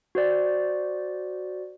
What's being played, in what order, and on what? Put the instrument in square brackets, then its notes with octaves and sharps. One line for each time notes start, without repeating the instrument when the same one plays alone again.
[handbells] F#4 C5 D5